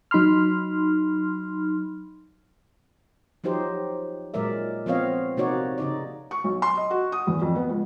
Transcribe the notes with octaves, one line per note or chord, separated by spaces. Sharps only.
F#3 D#4 B5 C6 F6
F3 F#3 D#4 G4 C5
A#2 F#3 G#3 A#4 D5 E5
F3 B3 C4 C#5 D#5 F5
C3 A#3 D#4 F#4 C#5 D5
C#3 D#4 D5
C#6
B1
C6
D#5
F#4
D#6
E2
F2
B3
C#2